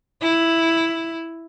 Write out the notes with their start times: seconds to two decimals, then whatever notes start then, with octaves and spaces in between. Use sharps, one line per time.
0.21 E4